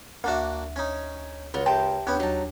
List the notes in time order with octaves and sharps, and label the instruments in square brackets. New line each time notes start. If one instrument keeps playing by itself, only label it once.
[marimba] D2 E5 [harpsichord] A#3 D4 F#4
[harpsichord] C#4 D#4
[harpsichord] C#2 [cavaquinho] F4 F#4
[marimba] G4 E5 C6 [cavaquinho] A#4 G5 A5
[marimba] D#2 D4 G6 [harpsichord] B3 C#4
[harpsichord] F#3 [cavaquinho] D#4 A5